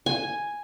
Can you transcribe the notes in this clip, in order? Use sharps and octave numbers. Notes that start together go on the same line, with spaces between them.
G#5